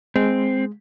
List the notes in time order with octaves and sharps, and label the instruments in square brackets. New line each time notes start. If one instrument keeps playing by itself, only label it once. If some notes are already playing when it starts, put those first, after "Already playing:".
[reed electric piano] G#3 [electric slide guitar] C4